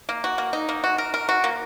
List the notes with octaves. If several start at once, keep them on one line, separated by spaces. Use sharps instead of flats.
A#3
F#4
A#3
D#4
A#3
F#4
A#4
A#4
F#4
A#3